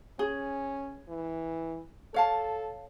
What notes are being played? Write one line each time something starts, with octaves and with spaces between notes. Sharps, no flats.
C#4 G#4
E3
A4 C#5 F5 A5